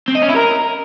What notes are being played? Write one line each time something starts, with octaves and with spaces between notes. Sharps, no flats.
C4
D#5
C#4
E4
A#4